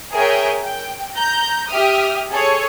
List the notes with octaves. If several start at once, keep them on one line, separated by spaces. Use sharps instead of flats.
G#4 A#4 C#5 E5 G5 G#5
G5
A#5 G6
G4 E5 D#6 F6
G#4 A4 C#5